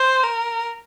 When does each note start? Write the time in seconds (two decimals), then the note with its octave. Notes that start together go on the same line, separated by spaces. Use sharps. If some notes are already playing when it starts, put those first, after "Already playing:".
Already playing: C5
0.23 A#4